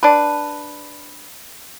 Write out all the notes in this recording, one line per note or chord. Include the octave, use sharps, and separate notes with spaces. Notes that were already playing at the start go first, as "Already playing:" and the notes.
D4 B4